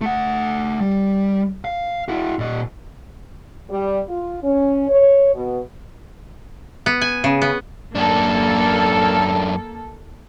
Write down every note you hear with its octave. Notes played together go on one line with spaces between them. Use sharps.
A3 F#5
G3
F5
E4 F#4
A#2 D#5
G3
F4
C#4
C#5
B2
B3
G#5
C#3
B3
F#2 A#3 D4 A4